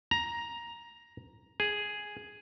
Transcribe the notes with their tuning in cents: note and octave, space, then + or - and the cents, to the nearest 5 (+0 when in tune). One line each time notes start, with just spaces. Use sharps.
A#5 +10
G#4 +0